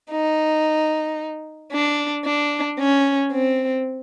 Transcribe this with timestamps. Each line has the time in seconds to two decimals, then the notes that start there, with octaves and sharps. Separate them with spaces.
0.11 D#4
1.72 D4
2.25 D4
2.79 C#4
3.32 C4